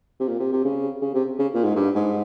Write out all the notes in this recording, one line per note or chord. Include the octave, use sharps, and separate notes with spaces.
C3
A#2
C3
C3
C#3
C#3
C3
C#3
A#2
G#2
G2
G#2